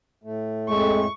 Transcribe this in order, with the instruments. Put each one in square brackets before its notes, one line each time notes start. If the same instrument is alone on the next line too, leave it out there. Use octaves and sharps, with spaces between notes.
[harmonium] A2 A3
[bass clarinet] F2 [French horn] G#3 [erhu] C#6